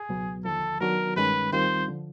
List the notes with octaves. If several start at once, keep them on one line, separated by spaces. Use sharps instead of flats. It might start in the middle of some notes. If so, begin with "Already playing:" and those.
Already playing: G#4
C#2 B2 F#3 B3
D#2 D3 F3 A4
D#3 F#3 B3 D4 F#4 A#4
G2 D#3 G#3 C#4 B4
D#2 D#3 G3 C4 F4 C5
D3 F3